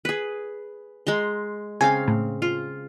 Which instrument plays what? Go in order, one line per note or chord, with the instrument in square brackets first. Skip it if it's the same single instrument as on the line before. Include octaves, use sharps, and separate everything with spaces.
[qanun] G#4 B4
G#3 A#5 C6
[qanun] C#3 C4 F5 [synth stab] G#5
[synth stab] A2
[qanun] F4